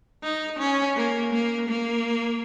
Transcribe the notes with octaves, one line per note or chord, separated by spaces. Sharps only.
D#4
C#4
A#3
A#3
A#3